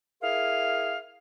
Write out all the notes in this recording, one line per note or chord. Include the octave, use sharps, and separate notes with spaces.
E4 G#4 A#4 F5